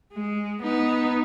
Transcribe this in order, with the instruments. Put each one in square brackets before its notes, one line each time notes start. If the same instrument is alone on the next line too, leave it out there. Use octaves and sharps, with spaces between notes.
[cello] G#3
B3 D#4